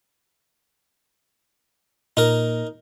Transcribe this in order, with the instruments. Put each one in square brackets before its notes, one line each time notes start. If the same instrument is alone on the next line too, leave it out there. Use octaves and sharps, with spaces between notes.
[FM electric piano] A#2 [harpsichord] D#4 A#4